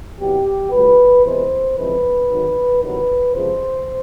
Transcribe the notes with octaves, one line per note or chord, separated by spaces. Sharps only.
C2 B2 F#3 G4
C#2 C#3 F#3 B4
E2 C3 E3 G#3 C5
F2 C#3 E3 G#3 B4
G#1 G#2 D#3 F#3
E2 C3 D#3 F#3 B4
C#2 C3 F3 G#3 C5